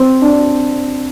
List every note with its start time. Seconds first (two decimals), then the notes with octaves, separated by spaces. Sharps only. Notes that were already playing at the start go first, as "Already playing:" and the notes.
Already playing: C4
0.22 D4